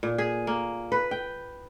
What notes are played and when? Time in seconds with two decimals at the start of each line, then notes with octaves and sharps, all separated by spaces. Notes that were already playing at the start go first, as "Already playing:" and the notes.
0.03 A#2
0.18 G#4
0.47 A#3
0.92 B4
1.11 G5